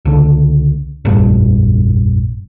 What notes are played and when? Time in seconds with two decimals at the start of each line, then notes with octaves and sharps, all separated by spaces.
0.05 C#2 D3
1.05 F1 A#1 G2